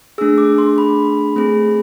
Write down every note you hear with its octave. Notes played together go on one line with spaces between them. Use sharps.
A3 D4 G#4 E6
D6
C6
B5
A3 C4 G#4